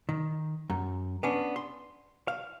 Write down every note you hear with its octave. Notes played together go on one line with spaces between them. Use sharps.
D#3
F#2
B3 C#4 D4
C6
F5